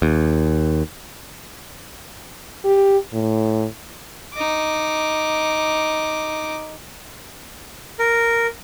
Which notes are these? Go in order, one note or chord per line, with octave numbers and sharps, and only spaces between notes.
D#2
G4
A2
D#4 D6
A#4